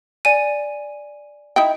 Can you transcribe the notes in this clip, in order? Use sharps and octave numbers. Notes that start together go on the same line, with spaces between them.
D5 G#5 D#7
D#4 E4 G5